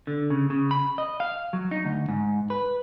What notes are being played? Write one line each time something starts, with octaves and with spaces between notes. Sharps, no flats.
D3
C#3
C#3
B5
D#5
F5
F#3
D#4
D2
G#2
B4